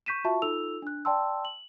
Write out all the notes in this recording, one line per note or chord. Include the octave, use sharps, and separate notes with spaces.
C#6 G6 B6 D#7 E7
F4 F#4 E5 A5 C#6
D#4 F4 A4 E6 F7
D4 F#6
D5 G5 A5 C6 E6
F#7